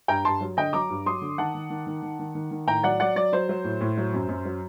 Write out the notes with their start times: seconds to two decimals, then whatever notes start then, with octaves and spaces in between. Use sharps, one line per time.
0.08 G2 G5 A#5
0.25 G2 A5 C6
0.41 F#3
0.57 D3 D#5 G5
0.73 F#3 A#5 D6
0.90 G2
1.06 F#3 C6 D#6
1.22 D3
1.38 D#3 F#5 A5
1.55 D#3
1.70 D#3
1.87 D#3
2.02 D#3
2.19 D#3
2.35 D#3
2.51 D#3
2.67 A2 G5 A#5
2.83 F#3 D5 F#5
3.00 F#3 D5 F#5
3.16 F#3 D5
3.33 F#3 C5
3.49 F#3
3.64 A2
3.81 A2
3.98 F#3
4.14 F#2
4.29 F#2
4.45 F#3